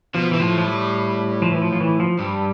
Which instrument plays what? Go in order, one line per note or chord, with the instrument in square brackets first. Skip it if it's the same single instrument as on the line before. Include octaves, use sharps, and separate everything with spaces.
[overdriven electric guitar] B2 [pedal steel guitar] F3
[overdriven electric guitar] B2 [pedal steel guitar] E3
[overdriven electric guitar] A2 [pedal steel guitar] F3
[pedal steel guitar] F3
G3
F3
E3
F3
F3
E3
F3
[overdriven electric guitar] G2 [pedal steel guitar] G3